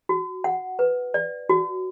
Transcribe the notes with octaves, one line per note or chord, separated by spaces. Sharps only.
F#4
F#5
B4
D5
F#4